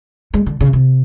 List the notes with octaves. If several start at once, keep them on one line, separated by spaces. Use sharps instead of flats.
G#3
D3
C#3
C3